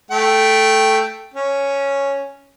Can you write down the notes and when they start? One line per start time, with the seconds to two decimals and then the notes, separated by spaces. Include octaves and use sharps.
0.11 A3 G5
1.34 C#4